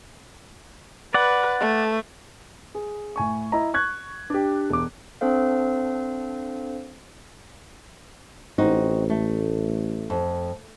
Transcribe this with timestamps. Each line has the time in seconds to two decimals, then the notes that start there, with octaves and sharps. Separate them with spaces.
1.14 B4 D5 F#5
1.60 A3
2.75 G#4
3.16 A2 G#5 C#6
3.52 E4 D#5 A#5
3.74 C#6 F#6 G#6
4.30 D4 G4
4.70 E1 D6
5.21 C4 D4 A4 C5 F5
8.58 A1 C4 D#4 F#4
9.10 A3
10.10 F2